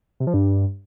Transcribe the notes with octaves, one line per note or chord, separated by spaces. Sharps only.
C3
F3
G2